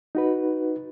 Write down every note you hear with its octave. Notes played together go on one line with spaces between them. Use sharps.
D#4 F#4 B4